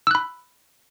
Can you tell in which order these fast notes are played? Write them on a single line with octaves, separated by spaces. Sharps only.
E6 F#6 B5